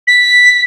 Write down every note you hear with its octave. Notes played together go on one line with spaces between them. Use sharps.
B6